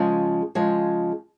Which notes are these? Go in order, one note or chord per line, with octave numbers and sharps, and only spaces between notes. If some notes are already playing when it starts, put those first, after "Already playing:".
Already playing: C#3 F3 G#3
C#3 F3 G#3